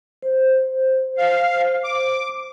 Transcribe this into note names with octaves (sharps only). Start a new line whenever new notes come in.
C5
F5
D6